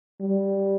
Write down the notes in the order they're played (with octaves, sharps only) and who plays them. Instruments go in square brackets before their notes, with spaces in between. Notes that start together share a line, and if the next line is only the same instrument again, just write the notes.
[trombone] G3